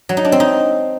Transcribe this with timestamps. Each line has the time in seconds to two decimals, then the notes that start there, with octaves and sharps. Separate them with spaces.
0.09 F#3
0.17 D#4
0.25 D4
0.32 C4
0.40 D#4